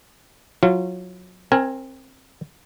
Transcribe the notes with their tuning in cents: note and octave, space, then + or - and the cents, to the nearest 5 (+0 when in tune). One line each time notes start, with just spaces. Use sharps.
F#3 -25 F4 -30
C4 +20 A#4 +0 G#5 +0